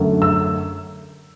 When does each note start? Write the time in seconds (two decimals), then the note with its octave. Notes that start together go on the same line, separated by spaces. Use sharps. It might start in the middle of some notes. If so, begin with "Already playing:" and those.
Already playing: F#2 D3 A3
0.22 E6